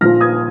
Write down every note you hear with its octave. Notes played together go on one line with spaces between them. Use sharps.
A#1 A#2 F3 F6 A#6
D#6 G#6